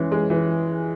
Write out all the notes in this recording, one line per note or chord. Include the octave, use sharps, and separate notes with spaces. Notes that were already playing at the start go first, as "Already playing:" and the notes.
Already playing: E3 G#3 C#4
G#3
E3